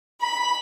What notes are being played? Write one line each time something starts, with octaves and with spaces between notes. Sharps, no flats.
B5